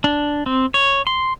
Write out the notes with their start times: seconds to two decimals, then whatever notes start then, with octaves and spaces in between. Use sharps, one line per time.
0.04 D4
0.46 C4
0.74 C#5
1.07 C6